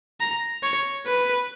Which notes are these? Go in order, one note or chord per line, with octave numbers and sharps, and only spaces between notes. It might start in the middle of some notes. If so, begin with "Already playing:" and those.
A#5
C#5
B4